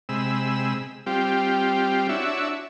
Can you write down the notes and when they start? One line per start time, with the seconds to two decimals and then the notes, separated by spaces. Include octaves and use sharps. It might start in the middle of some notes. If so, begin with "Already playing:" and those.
0.09 C3 G#3 B5 E6
1.07 G3 C4 F4 G4
2.09 D4 E4 F#4 C#5 E5